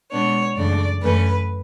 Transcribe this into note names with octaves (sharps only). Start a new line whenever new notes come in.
B2 G#3 B3 D4 C#5
F#2 C#3 E3 A3 D4 D5
F#2 E3 A3 C#4 B4